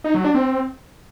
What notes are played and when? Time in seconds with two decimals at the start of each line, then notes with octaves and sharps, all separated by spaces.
0.04 D#4
0.14 F#3
0.24 D4
0.35 C4